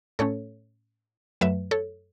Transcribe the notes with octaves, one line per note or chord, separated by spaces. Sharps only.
A2 A3 C#4 A4 C#5
F#2 F#3 A3 B4 E5
A4 C#5